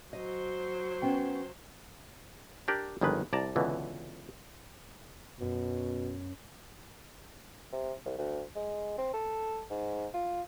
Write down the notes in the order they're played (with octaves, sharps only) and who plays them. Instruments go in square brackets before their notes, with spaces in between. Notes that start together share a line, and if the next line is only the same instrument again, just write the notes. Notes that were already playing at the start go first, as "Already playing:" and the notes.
[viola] F#3 C5 [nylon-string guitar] D#5
[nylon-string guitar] B3 C#4 G5
[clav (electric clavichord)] D4 G4 A#4 D5
G1 F2 D#3 F3 G#3 B4
C2 D5 A5 A#5
C#2 B2 D3 E3
[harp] F#2 [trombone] B2
[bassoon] C3
C2
D2
G#3
C4
A4
G#2
F4